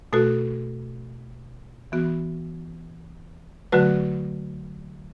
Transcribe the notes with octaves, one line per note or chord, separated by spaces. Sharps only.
B2 A3 F#4 A4
E3 B3 F#4
D3 F#3 A3 F#4 B4